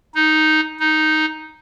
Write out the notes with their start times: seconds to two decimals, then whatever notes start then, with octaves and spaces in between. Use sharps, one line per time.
0.15 D#4
0.80 D#4